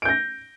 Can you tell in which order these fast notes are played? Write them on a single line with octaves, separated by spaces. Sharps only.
D7 G6 A#6